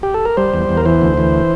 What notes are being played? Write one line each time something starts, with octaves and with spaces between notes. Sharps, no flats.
G4
A4
A#4
G3 C5
E2
E2
A#4
E3 C5
D2
E3